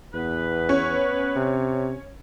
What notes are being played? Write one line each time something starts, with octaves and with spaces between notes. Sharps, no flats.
E2 B3 B4
C#4
C3